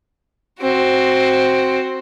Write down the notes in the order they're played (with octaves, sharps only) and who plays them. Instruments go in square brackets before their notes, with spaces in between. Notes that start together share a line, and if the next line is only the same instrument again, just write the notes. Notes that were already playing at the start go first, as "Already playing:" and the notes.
[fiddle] C4 F#4